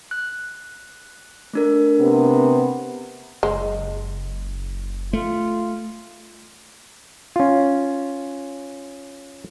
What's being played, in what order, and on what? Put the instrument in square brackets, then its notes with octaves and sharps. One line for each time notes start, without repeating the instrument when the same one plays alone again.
[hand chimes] F#6
A3 D4 A#4
[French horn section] C3 B3
[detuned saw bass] F#1 [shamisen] G#3
[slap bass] A3 [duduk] F4
[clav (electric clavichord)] C#4 F4